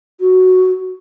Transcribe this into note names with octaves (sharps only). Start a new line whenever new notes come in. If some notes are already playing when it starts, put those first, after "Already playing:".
F#4